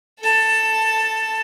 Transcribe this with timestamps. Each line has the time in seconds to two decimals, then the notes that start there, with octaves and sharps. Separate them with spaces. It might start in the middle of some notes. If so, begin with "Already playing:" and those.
0.19 A4 A5